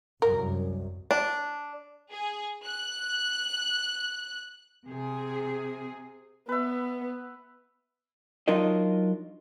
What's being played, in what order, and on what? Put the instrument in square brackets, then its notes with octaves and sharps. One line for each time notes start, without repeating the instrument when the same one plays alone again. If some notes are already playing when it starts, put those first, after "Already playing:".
[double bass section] C2 F#2 [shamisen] A#4
[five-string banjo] D4
[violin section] G#4
F#6
[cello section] C3 G#4
[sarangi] B3 [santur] B4 E5
[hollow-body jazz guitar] F#3 D4 D#4 F4 A#4 D#5